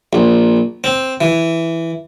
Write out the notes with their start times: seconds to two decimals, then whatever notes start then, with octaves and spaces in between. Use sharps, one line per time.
0.13 A#1
0.84 C4
1.21 E3